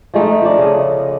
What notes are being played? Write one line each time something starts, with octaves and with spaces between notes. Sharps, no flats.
F3 G#3 A3 D#4
F3 D4
C#3 D#5